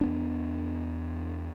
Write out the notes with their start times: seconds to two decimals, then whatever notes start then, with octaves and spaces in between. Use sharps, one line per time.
0.01 E2 B3 D4